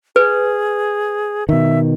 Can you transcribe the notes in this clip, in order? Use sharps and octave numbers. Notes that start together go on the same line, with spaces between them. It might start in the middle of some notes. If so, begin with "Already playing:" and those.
G#4 B4
B2 D#3 E5